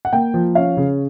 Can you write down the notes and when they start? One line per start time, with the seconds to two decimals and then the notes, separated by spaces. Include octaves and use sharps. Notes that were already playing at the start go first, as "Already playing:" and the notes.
0.05 F#5
0.13 A#3 G5
0.34 F3
0.55 C#4 F5
0.77 C#3